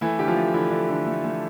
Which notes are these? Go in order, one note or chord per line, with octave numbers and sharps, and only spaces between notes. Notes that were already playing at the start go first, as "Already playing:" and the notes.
E3 A3 E4
D3 G4
F3 F4
A3
D3 E3 E4
D3
D3
A3
A3